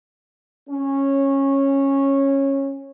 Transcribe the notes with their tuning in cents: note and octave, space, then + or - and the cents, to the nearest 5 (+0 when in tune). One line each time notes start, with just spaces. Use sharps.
C#4 -15